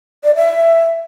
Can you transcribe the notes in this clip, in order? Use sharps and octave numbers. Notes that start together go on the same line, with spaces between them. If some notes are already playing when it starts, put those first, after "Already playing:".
D5
E5